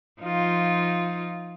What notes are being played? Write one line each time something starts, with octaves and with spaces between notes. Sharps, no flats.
F3 D#4 F4